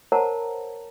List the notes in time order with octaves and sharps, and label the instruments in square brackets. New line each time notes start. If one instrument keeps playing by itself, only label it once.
[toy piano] A#4 C5 C#5 F#5 A5 A#5